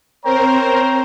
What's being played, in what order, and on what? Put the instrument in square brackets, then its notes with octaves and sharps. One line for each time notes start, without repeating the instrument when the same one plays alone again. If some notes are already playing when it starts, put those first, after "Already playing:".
[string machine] C4 A#4 C5 [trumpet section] C#5 G5 A#5